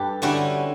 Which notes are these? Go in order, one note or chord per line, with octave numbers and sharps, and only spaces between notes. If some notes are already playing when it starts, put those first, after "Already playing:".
Already playing: G2 G4 A4 B4
D3 G3 C#4 E4 F#4